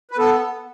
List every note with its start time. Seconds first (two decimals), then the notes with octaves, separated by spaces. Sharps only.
0.11 B4
0.18 B3 A4